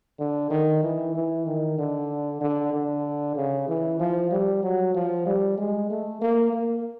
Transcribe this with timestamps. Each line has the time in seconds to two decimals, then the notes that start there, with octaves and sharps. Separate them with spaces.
0.19 D3
0.50 D#3
0.83 E3
1.15 E3
1.46 D#3
1.78 D3
2.41 D3
2.73 D3
3.36 C#3
3.68 E3
3.99 F3
4.31 G3
4.63 F#3
4.94 F3
5.26 G3
5.58 G#3
5.90 A3
6.21 A#3
6.53 A#3